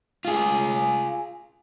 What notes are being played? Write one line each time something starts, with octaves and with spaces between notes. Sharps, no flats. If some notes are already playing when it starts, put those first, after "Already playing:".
F4 G#4